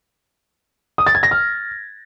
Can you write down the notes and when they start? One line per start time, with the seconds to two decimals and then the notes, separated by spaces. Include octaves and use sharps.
0.98 D#6
1.07 A6
1.15 G#6
1.23 A#6
1.31 F6